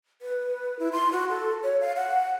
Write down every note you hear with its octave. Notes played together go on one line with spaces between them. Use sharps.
B4
E4
C6
F#4
A4
C#5
F5
F#5